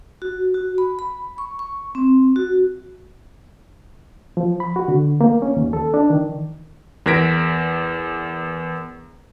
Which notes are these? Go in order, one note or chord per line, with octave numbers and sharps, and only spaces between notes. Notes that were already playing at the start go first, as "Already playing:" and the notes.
F#4
F#4
B5
B5
C#6
C#6
C4
F#4
F3
B5
F#4
D3
A#3
C#4
D#2
A4
D4
D#3
E2 A#4 G#6 A#6 B6 D7